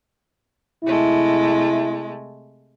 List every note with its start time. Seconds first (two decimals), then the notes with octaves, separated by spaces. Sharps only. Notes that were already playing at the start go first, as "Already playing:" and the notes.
0.84 C3 G#3 A3 E4